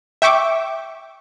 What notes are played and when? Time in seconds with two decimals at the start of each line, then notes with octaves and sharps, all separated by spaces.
0.22 E5 G5 C#6 D6